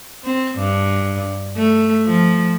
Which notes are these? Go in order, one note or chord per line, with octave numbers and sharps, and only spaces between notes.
C4
G2
A3
F3